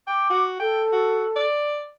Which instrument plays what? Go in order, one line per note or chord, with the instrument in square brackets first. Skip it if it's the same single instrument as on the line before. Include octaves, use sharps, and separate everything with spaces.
[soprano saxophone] G5 [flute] D6
[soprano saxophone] F#4
[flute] A4 [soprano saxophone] G5
[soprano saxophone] F#4
D5